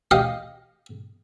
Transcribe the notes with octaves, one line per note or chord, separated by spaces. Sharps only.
G4 D#5 F5